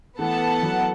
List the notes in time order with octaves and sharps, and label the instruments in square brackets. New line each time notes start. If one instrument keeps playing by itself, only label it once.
[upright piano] E3 A3 [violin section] B3 A4 F#5 A5
[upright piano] F#3